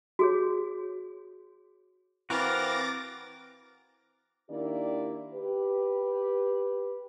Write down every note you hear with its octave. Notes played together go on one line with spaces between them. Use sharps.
F#4 G#4 C#5
E3 C4 F#4 A#4 F5 D6 A6 A#6
D#3 A#3 D4 E4 G4 D5
G4 B4